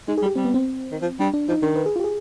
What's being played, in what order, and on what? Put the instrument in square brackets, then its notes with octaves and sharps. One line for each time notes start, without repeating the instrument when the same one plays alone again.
[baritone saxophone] G#3 [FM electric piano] D#4
[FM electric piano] G#4
[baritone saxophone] G3
[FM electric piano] G4
[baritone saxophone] G3 [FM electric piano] C4
[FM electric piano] B3
C4
[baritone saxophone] D#3
F3
[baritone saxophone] G3 [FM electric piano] D4
[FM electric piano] D4
[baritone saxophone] F3 [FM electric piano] D#4
[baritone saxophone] D#3 [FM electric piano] D4
[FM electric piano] B4
G#4
F4
G4
G#4